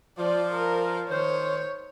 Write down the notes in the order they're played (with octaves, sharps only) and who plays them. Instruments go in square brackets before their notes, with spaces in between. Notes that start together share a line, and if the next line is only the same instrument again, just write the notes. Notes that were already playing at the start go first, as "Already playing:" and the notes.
[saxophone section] F3 [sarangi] D5
[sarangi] A#4
[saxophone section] D#3 C5 [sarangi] C#5